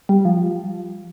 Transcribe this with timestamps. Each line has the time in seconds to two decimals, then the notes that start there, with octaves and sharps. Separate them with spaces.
0.09 G3
0.25 F3